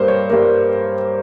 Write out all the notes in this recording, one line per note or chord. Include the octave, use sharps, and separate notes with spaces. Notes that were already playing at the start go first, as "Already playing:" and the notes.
Already playing: G2 G3 A#3 C5
C#5
G2 G3 A#3